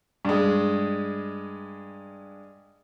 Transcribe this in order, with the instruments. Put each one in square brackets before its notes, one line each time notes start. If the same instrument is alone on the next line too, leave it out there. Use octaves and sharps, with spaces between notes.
[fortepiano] G2 G#3